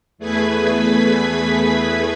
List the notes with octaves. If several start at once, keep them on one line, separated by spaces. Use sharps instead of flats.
E2 A3 G#4 B4 G#6 B6